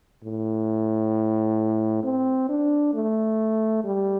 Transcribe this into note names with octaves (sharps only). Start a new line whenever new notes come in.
A2
C4
D4
A3
G3